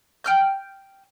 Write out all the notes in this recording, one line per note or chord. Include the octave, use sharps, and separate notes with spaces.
G5 F6 G6